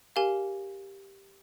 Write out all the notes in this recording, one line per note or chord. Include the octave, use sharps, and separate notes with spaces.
G4 A#4 F5 G#5